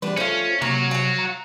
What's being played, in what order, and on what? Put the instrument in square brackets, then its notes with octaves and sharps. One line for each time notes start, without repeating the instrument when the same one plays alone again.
[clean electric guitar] E3 G3 G4 [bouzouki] D4 B4
[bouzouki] A3 F4 [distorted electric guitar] C#4 [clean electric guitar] C5 F5
[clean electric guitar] C3 [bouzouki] A#3 [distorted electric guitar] F#4 C#5
[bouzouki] F5 F#5
[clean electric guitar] A#5